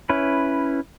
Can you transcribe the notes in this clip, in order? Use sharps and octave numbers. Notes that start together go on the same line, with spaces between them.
C#4 E4 B4